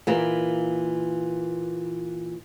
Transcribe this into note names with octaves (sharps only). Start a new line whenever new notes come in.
A#2 E3 A#3